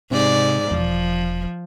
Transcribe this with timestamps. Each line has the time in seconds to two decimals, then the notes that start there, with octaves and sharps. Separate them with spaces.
0.11 G#2 C3 D5
0.71 E1 F3